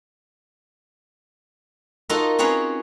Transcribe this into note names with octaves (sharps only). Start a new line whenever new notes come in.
D#4 F4 F#4 A4 A#4
C4 C#4 G#4 B4 C#5 A#5